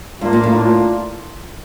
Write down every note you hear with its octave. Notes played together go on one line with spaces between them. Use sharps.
G#2 A#3 D4 F4
A#2
A2
A#3 D4 F4